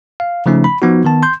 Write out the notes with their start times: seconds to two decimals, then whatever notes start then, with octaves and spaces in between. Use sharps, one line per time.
0.20 F5
0.46 C#3 F3 A3 C#4 D#4
0.64 B5
0.82 F3 B3 D#4 F#4
1.05 D#3 B3 A5
1.23 C6 G6